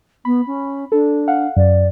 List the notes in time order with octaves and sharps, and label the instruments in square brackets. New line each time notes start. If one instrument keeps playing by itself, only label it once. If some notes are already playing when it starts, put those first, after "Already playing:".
[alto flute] B3 [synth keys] B5
[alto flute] C#4
[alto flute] D4 [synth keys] A4
[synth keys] F5 F#5
[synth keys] F#2 [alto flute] D5